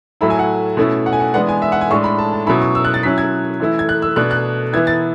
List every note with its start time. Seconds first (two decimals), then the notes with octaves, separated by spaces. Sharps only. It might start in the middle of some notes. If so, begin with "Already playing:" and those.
0.21 A2 F#3 A3 E4 B5
0.30 G#5
0.39 F#5
0.77 B2 A3 C#4 E4
1.06 F#5
1.13 G#5
1.20 F#5
1.34 E3 G#3 B3 D4 F#5
1.49 G#5
1.62 E5
1.72 F#5
1.81 G#5
1.90 A2 G#3 D4 C#6
2.04 B5
2.18 A5
2.33 A5
2.47 B2 F#3 C#4 E4 B5
2.62 C#6
2.75 E6
2.85 F#6
2.94 A6
3.03 F#3 C#4 E4 B6
3.18 G#6
3.60 E3 A3 E4
3.79 G#6
3.89 F#6
4.02 E6
4.16 B2 A3 D4 F#6
4.31 F#6
4.73 E3 B3 E4 G#6
4.87 A6